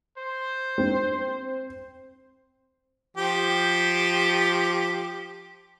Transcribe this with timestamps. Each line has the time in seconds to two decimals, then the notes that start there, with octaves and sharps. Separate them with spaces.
0.18 C5
0.78 C4
3.17 F3 G4